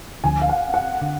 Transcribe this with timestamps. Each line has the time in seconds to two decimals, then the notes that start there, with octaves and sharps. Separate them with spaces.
0.24 D2 D3 F3 G#5
0.41 F5
0.49 F#5
0.74 F#5
1.02 D3